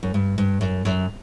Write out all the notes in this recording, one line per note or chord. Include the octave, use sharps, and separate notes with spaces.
F#2
G2
G2
F#2
F#2